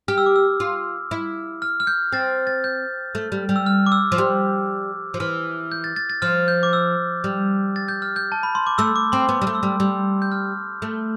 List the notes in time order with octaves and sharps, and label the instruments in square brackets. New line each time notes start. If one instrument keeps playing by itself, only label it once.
[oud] G4 [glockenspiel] F6
[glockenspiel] E6
D6
E6
[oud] F4
E4
[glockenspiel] F6
F6
G6
[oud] C4 [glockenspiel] A6
[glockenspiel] A6
G6
[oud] A3
G3
G3
[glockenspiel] E6
F6
D6
E6
[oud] F3
G3
F3
[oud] E3 [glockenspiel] F6
[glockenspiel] G6
A6
A6
A6
[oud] F3 [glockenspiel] F6
[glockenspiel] G6
D6
E6
[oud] G3
[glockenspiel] A6
G6
F6
G6
A5
B5
C6
D6
[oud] A3 [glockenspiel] E6
[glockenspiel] D6
[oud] C4 [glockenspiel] C6
[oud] B3 [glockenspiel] D6
[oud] G3
A3
[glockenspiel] E6
[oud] G3
[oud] G3 [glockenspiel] E6
[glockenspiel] G6
F6
[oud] A3